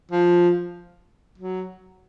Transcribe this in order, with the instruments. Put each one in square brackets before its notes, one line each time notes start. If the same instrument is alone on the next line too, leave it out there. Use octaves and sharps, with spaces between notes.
[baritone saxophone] F3
F#3